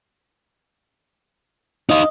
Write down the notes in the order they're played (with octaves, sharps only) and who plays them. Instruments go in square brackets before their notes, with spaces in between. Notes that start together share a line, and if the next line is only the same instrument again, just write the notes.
[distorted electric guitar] D#4 F5 [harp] D#5